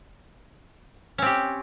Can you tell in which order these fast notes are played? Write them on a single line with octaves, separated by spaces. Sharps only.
C#4 C4 G4